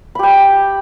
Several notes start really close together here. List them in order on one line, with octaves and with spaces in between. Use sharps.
B5 G4 G5